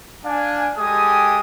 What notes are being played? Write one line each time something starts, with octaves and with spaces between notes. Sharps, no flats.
D4 F5 G#5
G#3 G4 A4 G5 G#5 D#6